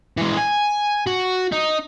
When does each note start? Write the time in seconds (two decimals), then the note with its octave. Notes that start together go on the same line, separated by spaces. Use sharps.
0.17 E3 G#3
0.38 G#5
1.07 F#4
1.52 D#4